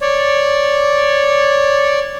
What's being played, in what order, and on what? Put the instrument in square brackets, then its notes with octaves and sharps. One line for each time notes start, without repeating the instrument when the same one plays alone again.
[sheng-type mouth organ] C#5 D5